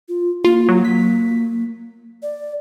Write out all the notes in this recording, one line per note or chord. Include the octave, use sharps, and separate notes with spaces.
F4
A#3 F4
F#3
B6
D5